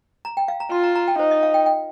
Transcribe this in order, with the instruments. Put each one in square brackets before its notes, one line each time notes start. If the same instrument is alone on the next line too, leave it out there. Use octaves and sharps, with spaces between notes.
[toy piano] A#5
G5
F5
A#5
[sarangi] F4 [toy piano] C6
[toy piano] A#5
A#5
G5
[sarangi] D#4 [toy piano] C5
[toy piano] D#5
F5
G5
G5